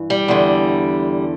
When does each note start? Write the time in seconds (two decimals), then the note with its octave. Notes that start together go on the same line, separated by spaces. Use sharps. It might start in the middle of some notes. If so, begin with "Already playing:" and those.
Already playing: G2 E3
0.10 G3
0.28 E2 D3